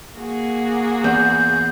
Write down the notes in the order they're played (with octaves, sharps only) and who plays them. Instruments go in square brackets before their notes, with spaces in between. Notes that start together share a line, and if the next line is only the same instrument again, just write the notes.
[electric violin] A#3 [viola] F#4 G#4
[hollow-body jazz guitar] E2 [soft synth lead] G6